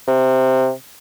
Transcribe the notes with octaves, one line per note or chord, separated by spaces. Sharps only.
C3